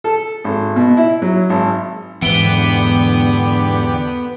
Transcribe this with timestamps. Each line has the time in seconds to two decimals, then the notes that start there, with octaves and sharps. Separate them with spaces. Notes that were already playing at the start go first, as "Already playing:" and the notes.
0.04 A4
0.44 G#1
0.76 B2
0.97 E4
1.22 F#3
1.50 G#1
2.22 E2 G#2 D3 E3 B3 G4 D7 G7